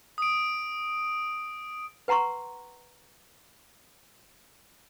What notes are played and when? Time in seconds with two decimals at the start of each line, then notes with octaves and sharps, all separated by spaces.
0.18 D#6 D7
2.08 B4 F#5 A#5 C6 C#6